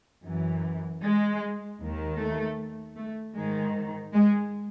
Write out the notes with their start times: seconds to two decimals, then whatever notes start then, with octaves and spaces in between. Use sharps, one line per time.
0.23 F#2 E3
1.02 G#3
1.79 D#2 D#3
2.18 A3
2.96 A3
3.35 G#2 D#3 G#3
4.13 G#3